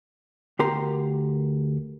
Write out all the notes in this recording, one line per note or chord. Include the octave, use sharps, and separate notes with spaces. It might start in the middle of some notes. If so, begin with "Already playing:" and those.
D2 G4 A#4 C6